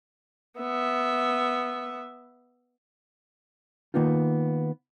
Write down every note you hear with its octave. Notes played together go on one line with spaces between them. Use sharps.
B3 E5
D#3 A#3 B3 D#4 F4